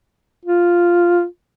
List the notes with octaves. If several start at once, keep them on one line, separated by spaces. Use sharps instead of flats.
F4